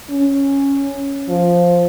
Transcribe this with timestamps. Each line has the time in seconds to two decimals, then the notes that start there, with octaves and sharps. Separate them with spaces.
0.10 C#4
1.29 F3